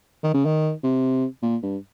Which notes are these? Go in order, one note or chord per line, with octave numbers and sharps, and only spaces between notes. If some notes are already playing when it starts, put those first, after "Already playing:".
D#3
C#3
D#3
C3
A#2
G2